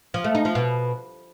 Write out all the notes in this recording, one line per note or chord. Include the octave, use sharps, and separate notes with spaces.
F3
A3
D#4
F3
B2